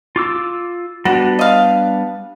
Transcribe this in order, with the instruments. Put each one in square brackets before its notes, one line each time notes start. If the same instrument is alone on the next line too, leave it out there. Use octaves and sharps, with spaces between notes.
[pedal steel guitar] F4 D6 E6
[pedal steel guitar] G3 B3 D4 [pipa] F#4
[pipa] D#5 F5